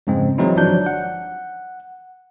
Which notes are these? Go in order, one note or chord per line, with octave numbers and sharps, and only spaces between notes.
F2 G#2 C#3 G#3 C4
E3 F#3 G#3 C4 D#4 E4
G1 F3 F#3 D4 G6
F#5